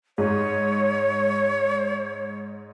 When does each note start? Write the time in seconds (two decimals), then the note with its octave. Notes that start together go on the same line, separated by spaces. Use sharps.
0.18 G#2 C#5